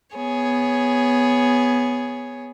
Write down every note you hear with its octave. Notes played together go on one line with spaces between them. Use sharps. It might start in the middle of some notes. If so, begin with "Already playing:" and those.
B3 G#4 C#5